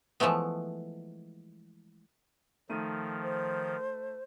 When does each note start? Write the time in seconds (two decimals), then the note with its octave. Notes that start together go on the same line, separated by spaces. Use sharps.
0.20 E3 F3 G#3 A3 B3
2.69 D#3 F3 A3 D#4 D#7
3.23 C5